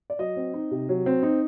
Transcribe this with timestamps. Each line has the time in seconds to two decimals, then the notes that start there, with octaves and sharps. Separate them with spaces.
0.10 D5
0.19 F#3 D#5
0.36 C4
0.54 D#4
0.71 C3
0.89 F#3
1.06 C4
1.23 D#4